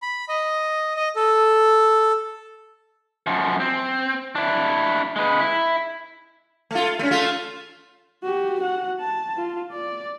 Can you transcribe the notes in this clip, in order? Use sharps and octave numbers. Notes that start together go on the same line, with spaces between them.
B5
D#5
D#5
A4
F#2 F3
C4
D4 E4
G#3 B4
E4
A3 F4
A3 C#4
A3 F4
F#4 G4
F#4 F#5
A5
F4
D5